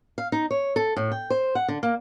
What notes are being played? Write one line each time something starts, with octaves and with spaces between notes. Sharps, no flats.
F5
D#4
C#5
A4
A2
G5
C5
F#5
D3
A#3